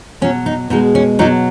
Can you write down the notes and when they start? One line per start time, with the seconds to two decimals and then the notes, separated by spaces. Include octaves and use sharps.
0.21 B2 F#3 C#4
0.46 D#4
0.70 B2 G#3 D#4
0.95 C#4
1.19 B2 F#3 D#4